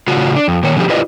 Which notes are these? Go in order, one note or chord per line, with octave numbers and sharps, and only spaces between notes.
A2 C#3 F4 F#4
D4
F2
A#2 D#3 C#5
B2 D3 F3 A#3 G4
E4 F4 G4 B4 D5 D#5